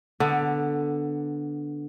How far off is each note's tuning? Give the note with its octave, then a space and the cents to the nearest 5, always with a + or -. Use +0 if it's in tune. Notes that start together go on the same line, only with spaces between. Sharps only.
D3 +0 B3 +5